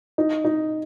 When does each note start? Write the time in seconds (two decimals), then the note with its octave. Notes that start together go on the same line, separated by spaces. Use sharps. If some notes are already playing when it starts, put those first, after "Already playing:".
0.18 D#4
0.45 D#4